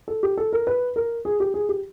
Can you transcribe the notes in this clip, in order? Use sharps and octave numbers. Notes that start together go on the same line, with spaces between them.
A4
G4
A4
A#4
B4
A#4
G#4
G4
G#4
G4